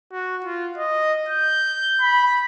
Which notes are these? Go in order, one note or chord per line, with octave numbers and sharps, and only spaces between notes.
F#4
F4
D#5
G6
B5